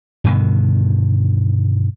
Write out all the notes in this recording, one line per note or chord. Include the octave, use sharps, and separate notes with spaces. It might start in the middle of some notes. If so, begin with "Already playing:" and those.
G2 B2 D3 D#3